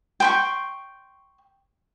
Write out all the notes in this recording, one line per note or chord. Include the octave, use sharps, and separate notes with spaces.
G5 C6 C#6